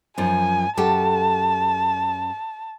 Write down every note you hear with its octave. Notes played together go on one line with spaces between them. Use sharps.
F#2 F3 G#5
F#2 G4 A4 A5